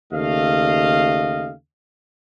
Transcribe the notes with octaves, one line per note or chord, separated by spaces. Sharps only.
D#2 C#3 A3 D#5 F5